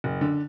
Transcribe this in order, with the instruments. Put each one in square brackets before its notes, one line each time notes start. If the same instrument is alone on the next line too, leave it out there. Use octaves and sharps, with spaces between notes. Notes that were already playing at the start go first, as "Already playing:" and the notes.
[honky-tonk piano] F#1
D3